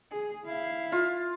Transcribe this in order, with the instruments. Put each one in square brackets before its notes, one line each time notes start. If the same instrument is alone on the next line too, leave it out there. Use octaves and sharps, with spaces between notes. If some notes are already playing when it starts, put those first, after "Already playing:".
[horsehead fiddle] G#4
[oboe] E4 [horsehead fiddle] F5
[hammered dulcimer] F4